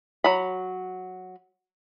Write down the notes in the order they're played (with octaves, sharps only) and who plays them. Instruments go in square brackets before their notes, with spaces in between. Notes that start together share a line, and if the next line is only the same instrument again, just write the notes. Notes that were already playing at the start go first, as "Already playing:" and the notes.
[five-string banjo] F#3 B5